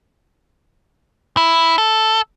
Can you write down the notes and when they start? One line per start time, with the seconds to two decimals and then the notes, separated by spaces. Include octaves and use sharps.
1.37 E4
1.78 A4